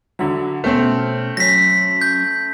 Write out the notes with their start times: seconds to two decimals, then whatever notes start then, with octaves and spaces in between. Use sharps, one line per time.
0.19 D3 F#3 E5 A#5 B5
0.64 B2 A3 C4 C#4 F6
1.37 F#3 C#4 A#6 B6
2.01 G6